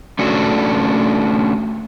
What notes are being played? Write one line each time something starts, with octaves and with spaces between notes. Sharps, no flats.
A3 C#4 D4 F#4 A4